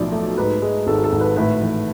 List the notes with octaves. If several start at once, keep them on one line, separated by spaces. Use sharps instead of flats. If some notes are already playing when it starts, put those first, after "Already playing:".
Already playing: B1 A2 F3 D5
A3
G#2 B4
G#3
G#1 A4
A4
G#1
B4
A2 B4
E3